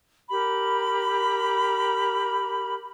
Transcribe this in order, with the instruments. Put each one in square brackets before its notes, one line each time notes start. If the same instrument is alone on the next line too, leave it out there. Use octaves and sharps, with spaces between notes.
[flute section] G4 A#4 B5